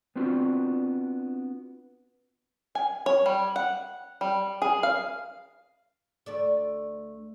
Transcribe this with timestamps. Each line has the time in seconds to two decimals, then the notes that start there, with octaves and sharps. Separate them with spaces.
0.16 B3 C4 D4 F4 F#4
2.75 G#5
3.06 C#5
3.26 G3
3.56 F#5
4.21 G3
4.62 G#4
4.83 F5
6.26 D2 A3 D5